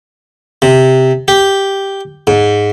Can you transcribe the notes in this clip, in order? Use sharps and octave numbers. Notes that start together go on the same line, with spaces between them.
C3
G4
G#2